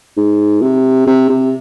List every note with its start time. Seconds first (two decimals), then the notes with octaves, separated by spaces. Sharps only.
0.17 G#2
0.61 C3
1.07 C3
1.30 C3